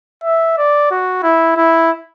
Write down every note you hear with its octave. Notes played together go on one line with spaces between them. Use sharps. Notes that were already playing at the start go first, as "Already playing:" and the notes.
E5
D5
F#4
E4
E4